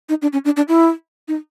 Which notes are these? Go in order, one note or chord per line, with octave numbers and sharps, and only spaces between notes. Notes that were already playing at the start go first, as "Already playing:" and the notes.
D#4
D4
C#4
D4
D4
E4
D#4